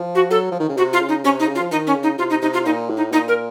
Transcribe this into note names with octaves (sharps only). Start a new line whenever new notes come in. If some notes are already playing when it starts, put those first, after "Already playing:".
Already playing: F3
F#4
F#3 A4
F3
D#3
C#3
C3 F#4
F4
C#3
D#4
C3 C#4
D#4
C#3
F4
F3
D#3 D#4
C#4
C#3
D#4
C3 F4
D#4
C3 D#4
F4
A#2 D#4
A2
D#4
A#2 D#4
A#4